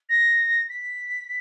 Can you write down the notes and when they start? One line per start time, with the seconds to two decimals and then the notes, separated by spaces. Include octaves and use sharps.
0.09 A#6
0.69 B6